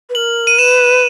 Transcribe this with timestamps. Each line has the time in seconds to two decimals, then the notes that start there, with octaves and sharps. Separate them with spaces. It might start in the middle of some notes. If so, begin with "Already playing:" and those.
0.10 B4
0.15 A#4 F#7
0.47 D#7
0.58 B4 E7